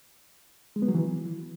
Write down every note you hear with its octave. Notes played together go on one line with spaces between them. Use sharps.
G#3
B3
F#3
E3